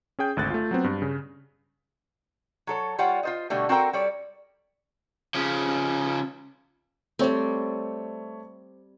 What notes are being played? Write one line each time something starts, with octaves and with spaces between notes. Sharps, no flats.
C#4 G#4 G5 G6
G#1 D2 F#6 A6
A3 F4
F#3 B3 C4
G2
C#3
F#3 A4 C#5
G3 F4 C#5 F#5 G5
F4 C5 D#5
B2 D3 G3 A3
C4 F#4 A4 A#4 C5 G5
G3 A4 C#5 D5
C#3 F3
G3 A3 C4 C#5